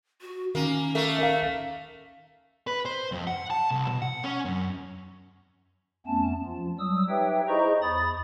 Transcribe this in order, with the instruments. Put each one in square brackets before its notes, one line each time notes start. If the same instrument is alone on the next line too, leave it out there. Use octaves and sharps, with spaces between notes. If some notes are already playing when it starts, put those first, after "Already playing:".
[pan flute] F#4
[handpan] D#3 [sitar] A#3 [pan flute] C#4
[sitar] A3 A#3
[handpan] A#4 [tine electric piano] E5 F5
[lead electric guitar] B4
C5
F2
F#5
A5
C2
B2
F#5
C#4
F#2
[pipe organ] F2 A3 B3 C#4 A5
F3 F4
F#3 G3 D#6 E6
D#4 G4 B4 C#5 E5 G5
E4 G#4 C5 D#5 A#5 C#6
E2 B5 D#6 A6